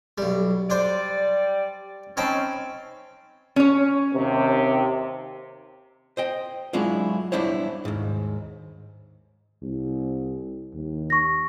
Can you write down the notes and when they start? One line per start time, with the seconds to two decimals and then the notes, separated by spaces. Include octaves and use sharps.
0.18 B1 G3
0.70 G3 D4 C5 D5
2.17 C4 C#4 D#4 A5 B5
3.56 C#4 C#5
4.14 D#2 C3
6.17 C5 D#5 G5
6.73 F#3 G#3 D4 E4 F4
7.32 G3 B3 D4 E4 C5 C#5
7.85 D#2 G#2
9.63 C2
10.75 D#2
11.10 C#6 A#6